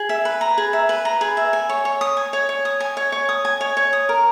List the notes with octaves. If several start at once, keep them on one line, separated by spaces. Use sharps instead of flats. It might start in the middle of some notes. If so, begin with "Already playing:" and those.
Already playing: G#4
E5
B4
A#5
G#4
E5
B4
A#5
G#4
E5
G#5
C#5
C#5
D#6
G#5
C#5
C#5
D#6
G#5
C#5
C#5
D#6
G#5
C#5
C#5
D#6
A#4